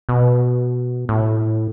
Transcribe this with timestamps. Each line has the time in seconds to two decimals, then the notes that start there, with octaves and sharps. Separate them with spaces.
0.09 B2
1.09 A2